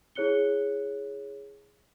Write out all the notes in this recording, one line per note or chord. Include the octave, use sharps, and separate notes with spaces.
E4 G#4 C#5 F#6 C#7 G7